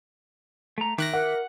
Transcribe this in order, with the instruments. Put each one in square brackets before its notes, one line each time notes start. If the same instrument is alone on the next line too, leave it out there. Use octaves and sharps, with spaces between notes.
[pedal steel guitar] A3 A#5
[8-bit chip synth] D#3 F#6 A#6 [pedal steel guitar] E5 D6
[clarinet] A#4 [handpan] F#5